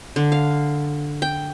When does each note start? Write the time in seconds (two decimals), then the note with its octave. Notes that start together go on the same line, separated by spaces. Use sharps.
0.16 D3
0.32 F5
1.22 G5